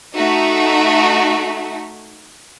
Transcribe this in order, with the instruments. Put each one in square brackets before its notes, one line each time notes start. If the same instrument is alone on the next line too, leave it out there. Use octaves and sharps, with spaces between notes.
[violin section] A3 D#4 F#4 E5